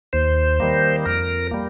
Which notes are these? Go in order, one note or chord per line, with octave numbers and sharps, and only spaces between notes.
D#2 C5
D#3 G3 A#3
F2 A#4
G3 A#3